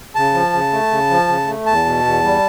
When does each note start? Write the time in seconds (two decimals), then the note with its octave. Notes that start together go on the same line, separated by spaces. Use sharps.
0.15 C#3 A5
0.34 F3
0.53 C#3
0.73 A3
0.91 C#3
1.10 F3
1.28 C#3
1.47 A3
1.66 E2 A5
1.85 B2
2.04 E2
2.24 G3